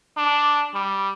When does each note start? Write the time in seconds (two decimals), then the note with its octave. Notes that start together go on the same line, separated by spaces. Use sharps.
0.17 D4
0.74 G3